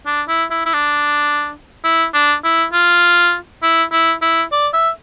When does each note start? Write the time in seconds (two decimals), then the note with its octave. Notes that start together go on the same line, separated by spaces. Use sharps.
0.06 D4
0.28 E4
0.51 E4
0.66 E4
0.73 D4
1.84 E4
2.14 D4
2.44 E4
2.73 F4
3.63 E4
3.92 E4
4.22 E4
4.52 D5
4.74 E5